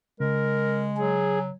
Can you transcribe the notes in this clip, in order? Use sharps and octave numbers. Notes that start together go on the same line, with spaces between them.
C#3 G#3 A#4
F#3 G#4